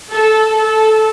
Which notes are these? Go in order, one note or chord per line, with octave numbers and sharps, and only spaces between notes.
A4
A4